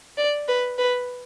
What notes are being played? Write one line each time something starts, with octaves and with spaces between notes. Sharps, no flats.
D5
B4
B4